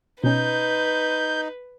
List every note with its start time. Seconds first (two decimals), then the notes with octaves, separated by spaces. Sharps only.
0.24 B2 C#4 D#4 B4 G6